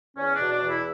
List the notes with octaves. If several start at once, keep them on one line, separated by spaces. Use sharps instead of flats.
E2 C#4
B2 D4
D4
E2
E4